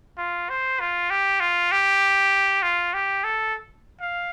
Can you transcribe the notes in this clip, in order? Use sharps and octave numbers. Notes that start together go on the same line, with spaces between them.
F4
C5
F4
G4
F4
G4
F4
G4
A4
F5